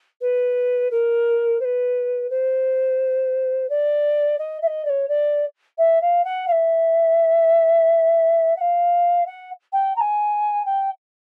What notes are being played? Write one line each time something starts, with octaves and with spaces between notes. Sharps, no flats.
B4
A#4
C5
B4
C5
D5
D#5
E5
D#5
D5
C#5
D5
E5
F5
F#5
F5
E5
F#5
F5
F#5
G5
A#5
G#5
G5